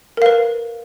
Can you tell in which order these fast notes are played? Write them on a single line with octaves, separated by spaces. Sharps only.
A#4 F5 B4